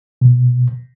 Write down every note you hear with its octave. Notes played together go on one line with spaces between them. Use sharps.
B2